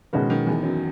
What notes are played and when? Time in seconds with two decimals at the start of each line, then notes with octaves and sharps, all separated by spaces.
0.13 B2 D#3 G#3 C#4 F#4 B4
0.30 D#3
0.46 E2 E3
0.63 F#2 F#3